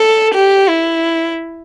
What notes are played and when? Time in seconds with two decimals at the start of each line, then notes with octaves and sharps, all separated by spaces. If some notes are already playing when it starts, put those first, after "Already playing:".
Already playing: A4
0.34 G4
0.69 E4